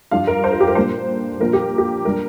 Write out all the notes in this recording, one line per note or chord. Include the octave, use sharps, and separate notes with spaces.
G2 F3 D4 F4 F5
A#4
C5
A#4
G4
A#4
A#2 G3 A#3 D4 C5
A#2 F3 A#3 D4 A#4
G4
G4
G3 D4 A#4